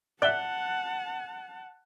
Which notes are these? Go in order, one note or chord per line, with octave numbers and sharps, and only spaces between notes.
D5 E5 F#5 A5 F#6 G7